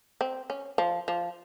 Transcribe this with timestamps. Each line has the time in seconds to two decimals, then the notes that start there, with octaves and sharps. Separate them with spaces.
0.21 C4
0.50 C#4
0.78 F3
1.08 F3